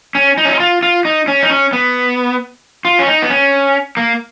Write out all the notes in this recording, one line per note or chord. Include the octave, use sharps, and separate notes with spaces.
C#4
D#4
C#4
D#4
F4
F4
D#4
C#4
D#4
C#4
B3
F4
C#4
D#4
B3
C#4
A#3